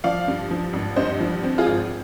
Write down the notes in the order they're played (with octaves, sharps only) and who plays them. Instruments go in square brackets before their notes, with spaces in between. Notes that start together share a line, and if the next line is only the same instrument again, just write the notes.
[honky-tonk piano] F3 D5 F5
G2
F3
G#1
G2 C5 D#5
F3
C4
F4 G#4
G#1